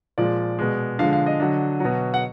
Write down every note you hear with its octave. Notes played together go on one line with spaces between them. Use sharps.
A#2 F3 G#3 D5
B2 G#3
D3 F3 G#3 F5
F5
D#5
D3 F#3
B2 F#3
F#5